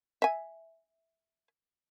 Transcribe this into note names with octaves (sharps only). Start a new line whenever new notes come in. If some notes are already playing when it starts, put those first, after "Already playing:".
E5 G#5